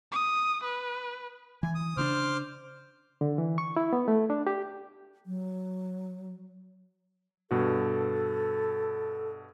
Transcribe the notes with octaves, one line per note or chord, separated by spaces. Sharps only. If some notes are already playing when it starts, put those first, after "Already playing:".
D#6
B4
E3 G#5
D#6
C#3 C#4 D4 C5 D6 F6
D3
E3
C#6
E4
B3
A3
D4
G4
F#3
G2 B2 F#4 A4